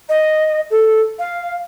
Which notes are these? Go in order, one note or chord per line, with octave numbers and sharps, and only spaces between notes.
D#5
A4
F5